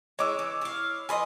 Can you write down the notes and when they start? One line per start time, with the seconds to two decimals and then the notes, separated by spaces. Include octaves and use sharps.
0.19 G#3 E4 C#5 D6 E6
0.39 E3
0.62 E4 F5
1.09 F3 B4 D#5 G#5 B5 C6